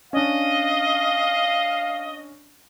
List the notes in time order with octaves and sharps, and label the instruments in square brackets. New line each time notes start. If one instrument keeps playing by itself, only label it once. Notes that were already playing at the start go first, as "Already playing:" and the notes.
[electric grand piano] C#4 D4 [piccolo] D#5 [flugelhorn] F5